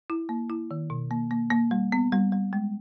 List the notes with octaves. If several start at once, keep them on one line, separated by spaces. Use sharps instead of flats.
E4
A#3
E4
D#3
B2
A#3
A#3
A#3
G3
B3
G3
G3
G#3